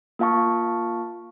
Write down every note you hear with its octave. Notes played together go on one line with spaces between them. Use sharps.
A#3 F4 F5 A5 C#6